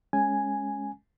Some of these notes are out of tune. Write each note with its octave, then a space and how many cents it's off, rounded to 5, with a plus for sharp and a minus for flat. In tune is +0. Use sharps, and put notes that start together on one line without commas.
G#3 +5 C#4 +0 G#5 +0